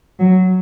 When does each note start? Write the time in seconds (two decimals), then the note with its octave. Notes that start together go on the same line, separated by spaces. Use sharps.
0.19 F#3